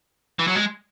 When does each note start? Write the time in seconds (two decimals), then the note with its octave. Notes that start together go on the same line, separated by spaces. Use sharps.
0.39 E3
0.47 F#3
0.55 G#3